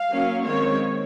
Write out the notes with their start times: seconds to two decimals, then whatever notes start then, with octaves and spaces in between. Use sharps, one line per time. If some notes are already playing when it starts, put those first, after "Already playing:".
Already playing: F5
0.09 F#3 A#3 C#4
0.44 D#3 G#3 C4 C#5